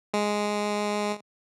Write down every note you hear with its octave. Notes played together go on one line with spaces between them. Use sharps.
G#3